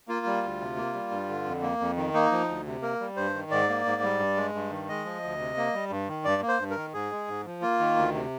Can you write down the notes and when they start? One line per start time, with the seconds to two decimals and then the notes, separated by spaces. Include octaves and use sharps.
0.08 A#3 F4
0.26 G3
0.43 D2
0.60 C3
0.76 A#3
0.94 G3
1.11 G2
1.29 D3
1.45 F2
1.62 A#3
1.80 F2
1.97 D#3
2.13 A#3 D#4
2.32 F3
2.49 D2
2.66 C3
2.82 A#3 A#4
3.00 G3
3.16 G2 C5
3.34 D#3
3.51 G#2 D5
3.69 A#3
3.86 G#2
4.02 G3
4.19 G2
4.37 G#3
4.54 G2
4.71 D#3
4.89 G#3 D#5
5.05 F3
5.23 D2
5.39 C3
5.57 A#3
5.74 G3
5.90 G2
6.09 D#3
6.25 G2 D5
6.42 A#3
6.48 C5
6.59 G2
6.70 A#4
6.77 D#3
6.93 G#2 G#4
7.11 G#3
7.28 G#2
7.46 F3
7.62 A#3 F4
7.79 D#3
7.96 D2
8.14 C3